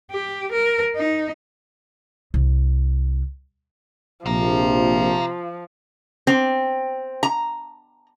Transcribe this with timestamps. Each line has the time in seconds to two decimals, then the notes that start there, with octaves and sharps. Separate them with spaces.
0.11 G4
0.52 A#4
0.96 D#4
2.34 C2
4.26 A#1 C3 F3 F5 A#5
6.27 C4
7.23 A#5